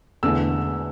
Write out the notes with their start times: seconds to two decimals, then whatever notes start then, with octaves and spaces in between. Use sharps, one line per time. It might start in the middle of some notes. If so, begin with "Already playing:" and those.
0.23 E1 E2 D3 A3 E6